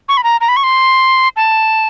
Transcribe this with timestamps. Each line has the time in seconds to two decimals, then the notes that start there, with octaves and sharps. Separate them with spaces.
0.09 C#6
0.17 B5
0.24 A#5
0.41 A#5
0.49 B5
0.57 C#6
0.64 C6
1.37 A5